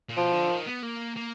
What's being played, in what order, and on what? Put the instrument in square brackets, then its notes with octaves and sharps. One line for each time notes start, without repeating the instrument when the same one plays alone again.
[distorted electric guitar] A#2
[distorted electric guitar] B2 [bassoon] F3
[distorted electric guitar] D3
D#3
B3
A#3
A#3